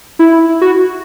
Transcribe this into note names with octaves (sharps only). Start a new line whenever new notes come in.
E4
F#4